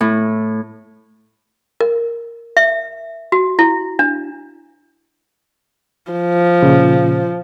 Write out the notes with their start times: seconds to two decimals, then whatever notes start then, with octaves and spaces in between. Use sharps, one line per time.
0.01 A2
1.81 A#4
2.57 E5
3.32 F#4
3.59 E4
3.99 D4
6.12 F3
6.63 A#2 C#3